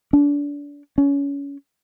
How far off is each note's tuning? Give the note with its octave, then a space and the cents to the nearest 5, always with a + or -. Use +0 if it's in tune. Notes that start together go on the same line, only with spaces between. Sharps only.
D4 -30
C#4 +25